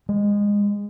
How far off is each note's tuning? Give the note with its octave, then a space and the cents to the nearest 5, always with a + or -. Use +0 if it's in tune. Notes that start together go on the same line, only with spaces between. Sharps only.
G#3 -20